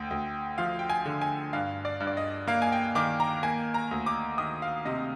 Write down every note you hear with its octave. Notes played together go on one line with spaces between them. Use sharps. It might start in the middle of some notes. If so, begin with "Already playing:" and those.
Already playing: D2 G5
D2
F3 F5
G5
G#5
D3
G#5
G2 F5
D5
G2
D5
D#5
A#3 F5
G#5
G5
D#3 D6
A#5
A#3 G#5
A#5
D2
D6
D#3 D#6
F5
C3 D#5